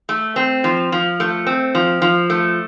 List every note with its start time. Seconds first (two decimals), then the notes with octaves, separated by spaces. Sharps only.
0.09 A3
0.36 C4
0.64 F3
0.92 F3
1.20 A3
1.46 C4
1.75 F3
2.02 F3
2.30 A3